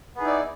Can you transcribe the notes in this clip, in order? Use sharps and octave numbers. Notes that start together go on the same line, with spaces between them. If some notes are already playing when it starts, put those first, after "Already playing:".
B3 D#4 E4 G#4 D5